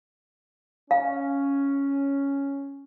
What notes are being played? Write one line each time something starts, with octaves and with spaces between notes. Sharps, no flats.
C#4 F5